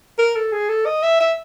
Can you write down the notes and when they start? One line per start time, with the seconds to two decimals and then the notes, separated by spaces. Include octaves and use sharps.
0.19 A#4
0.36 A4
0.53 G#4
0.69 A4
0.86 D#5
1.03 E5
1.20 E5